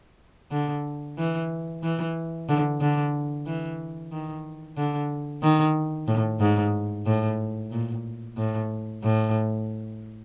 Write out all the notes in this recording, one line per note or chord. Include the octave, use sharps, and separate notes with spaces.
D3
E3
E3
D3
D3
E3
D#3
D3
D#3
A2
G#2
A2
A#2
A2
A2